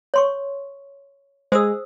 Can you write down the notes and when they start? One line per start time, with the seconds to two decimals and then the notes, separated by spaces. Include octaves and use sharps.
0.14 C#5 C6 C#6
1.52 G#3 G#4 C5 D#6 E6